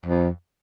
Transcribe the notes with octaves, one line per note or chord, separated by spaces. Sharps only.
F2